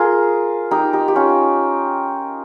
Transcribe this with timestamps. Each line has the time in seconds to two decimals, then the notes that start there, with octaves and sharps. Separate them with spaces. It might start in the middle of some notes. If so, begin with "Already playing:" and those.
Already playing: F4 G#4 A#4
0.71 D#4 G4
0.93 D#4 G4
1.08 G4
1.16 C#4 F4